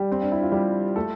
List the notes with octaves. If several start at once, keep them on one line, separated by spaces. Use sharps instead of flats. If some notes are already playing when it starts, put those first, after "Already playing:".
Already playing: G3 G4
C4
D4
E4
F4
G3 G4
A3 A4